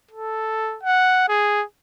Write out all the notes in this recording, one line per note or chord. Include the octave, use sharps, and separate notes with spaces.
A4
F#5
G#4